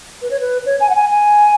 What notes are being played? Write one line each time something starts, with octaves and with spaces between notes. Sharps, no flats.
B4
C#5
B4
C#5
G#5
F#5
G#5
G#5